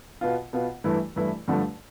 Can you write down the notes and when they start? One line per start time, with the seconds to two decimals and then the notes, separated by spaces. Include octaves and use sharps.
0.21 B2 B3 F4
0.53 B2 B3 F4
0.84 G2 E3 A3 E4
1.16 G2 E3 A3 E4
1.48 G2 D3 F3 A3